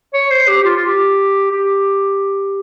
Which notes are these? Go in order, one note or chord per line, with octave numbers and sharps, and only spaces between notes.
C#5
C5
G4
G4
F4
F4
G4
G4